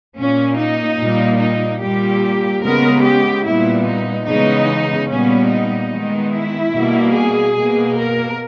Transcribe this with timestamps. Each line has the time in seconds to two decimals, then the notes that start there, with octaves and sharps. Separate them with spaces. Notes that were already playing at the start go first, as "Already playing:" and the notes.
0.17 A#2 A#3 C#4
0.58 D#4
0.99 A#2 G3 A#3
1.40 D#4
1.80 A#2 G3 A#3 G4
2.63 C#3 G#3 B3 A#4
3.04 G4
3.44 A#2 G3 B3 E4
3.86 D#4
4.27 C#3 E3 G#3 B3 D#4
5.09 A#2 G3 B3 C#4
5.50 D#4
5.91 D#3 G#3 B3
6.32 E4
6.72 B2 G3 A#3
7.14 G#4
7.55 B2 A#3
7.95 A#4